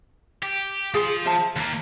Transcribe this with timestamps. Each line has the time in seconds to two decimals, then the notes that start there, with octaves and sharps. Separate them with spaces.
0.43 G4
0.94 F3 G#4 C6
1.25 C5 E5 A5
1.56 D#2 A#3